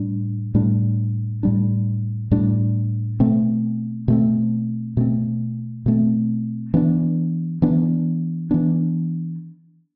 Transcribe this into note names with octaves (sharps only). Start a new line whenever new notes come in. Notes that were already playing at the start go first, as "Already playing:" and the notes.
Already playing: A2 G3 D4
A2 G3 D4
A2 G3 D4
A2 G3 D4
B2 A3 C4
B2 A3 C4
B2 A3 C4
B2 A3 C4
E3 B3 D4
E3 B3 D4
E3 B3 D4